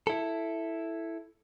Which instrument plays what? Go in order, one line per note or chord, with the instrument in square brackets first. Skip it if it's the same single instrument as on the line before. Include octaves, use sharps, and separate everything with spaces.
[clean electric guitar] E4 A4